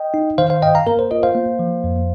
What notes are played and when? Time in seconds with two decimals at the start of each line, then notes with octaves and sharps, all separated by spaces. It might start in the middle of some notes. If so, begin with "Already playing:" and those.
Already playing: D#5 G5
0.14 D#4
0.38 D#3 C5 F5
0.50 C5 F5
0.62 G2 D#5 G5
0.75 F5 A#5
0.87 A#3 A#4
0.99 C5
1.11 F4 A#4 D#5
1.23 C5 F5
1.35 A#3
1.59 F3
1.84 F2